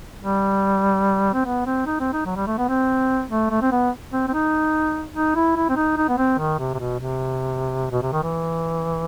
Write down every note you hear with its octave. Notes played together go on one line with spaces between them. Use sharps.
G3
C4
B3
C4
D#4
C4
D#4
F#3
G3
A3
B3
C4
A3
A3
C4
B3
C4
C4
D#4
D#4
E4
E4
C4
D#4
D#4
B3
C4
D#3
C3
C3
B2
C3
B2
C3
D#3
E3